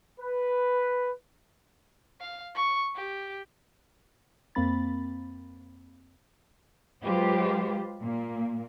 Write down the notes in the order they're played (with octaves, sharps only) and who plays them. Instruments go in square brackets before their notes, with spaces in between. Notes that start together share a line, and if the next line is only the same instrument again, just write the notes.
[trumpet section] B4
[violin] F5
C#6
G4
[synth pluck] F2 A#3 C4 B5 A6
[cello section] F#3 G#3 F4 G4 B4 C5
A#2 A#3